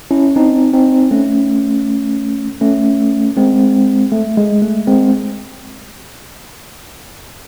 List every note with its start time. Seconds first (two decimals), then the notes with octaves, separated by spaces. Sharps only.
0.11 C#4 E4
0.36 C4 D#4
0.74 C4 D#4
1.11 A3 C#4
2.61 A3 C#4
3.37 G#3 C4
4.12 A3
4.37 G#3
4.62 A3
4.87 G#3 C4